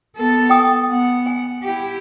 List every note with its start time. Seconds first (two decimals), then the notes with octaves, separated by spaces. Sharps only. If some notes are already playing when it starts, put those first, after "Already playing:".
0.17 B3 A4
0.50 G5 G#5 D#6
0.89 B3 F#5
1.26 G#5
1.63 E4 G4